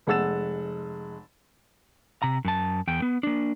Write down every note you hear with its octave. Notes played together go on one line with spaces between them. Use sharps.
F1 G#3 F#5 E6 A6 E7
C3 A#5
F#2 A5
E2 G5
B3
A#3 D4